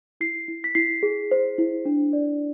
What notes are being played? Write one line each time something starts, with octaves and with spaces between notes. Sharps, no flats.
E4 C7
E4
B6
E4 C7
G#4
C5
E4
D4
D5